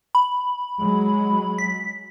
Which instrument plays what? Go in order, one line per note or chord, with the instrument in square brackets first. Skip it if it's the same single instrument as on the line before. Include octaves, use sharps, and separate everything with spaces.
[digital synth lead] B5
[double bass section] F#3 G#3
[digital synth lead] B6